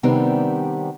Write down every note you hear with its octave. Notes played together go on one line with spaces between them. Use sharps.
C3 D#3 G3 B3 C4 D4